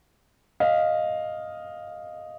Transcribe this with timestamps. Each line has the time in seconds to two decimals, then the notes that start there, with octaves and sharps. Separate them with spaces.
0.60 D#5 F5